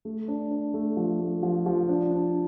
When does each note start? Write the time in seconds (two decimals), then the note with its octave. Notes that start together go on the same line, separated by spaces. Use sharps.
0.05 A3
0.28 D4
0.51 D4
0.74 A3
0.97 F3
1.20 A3
1.43 F3
1.66 F3
1.89 D4
2.11 D4